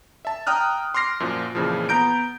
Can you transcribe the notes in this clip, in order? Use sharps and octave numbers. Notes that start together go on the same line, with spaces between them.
E5 A5
G5 A#5 D#6 F6 F#6
C6 D6 F6 A#6 C7
F#2 A#2 F3
F2 A#2 C#3 E3 F3
B3 A#5 G6 D7